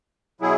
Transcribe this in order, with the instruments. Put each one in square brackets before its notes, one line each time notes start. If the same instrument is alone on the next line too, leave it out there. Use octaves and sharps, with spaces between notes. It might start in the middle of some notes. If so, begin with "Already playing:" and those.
[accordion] B2 F#3 E4 G#4